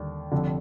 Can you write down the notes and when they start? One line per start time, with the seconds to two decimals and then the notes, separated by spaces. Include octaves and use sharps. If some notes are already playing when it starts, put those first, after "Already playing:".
Already playing: D#2 D3 G3 D4
0.31 F1 F2 D3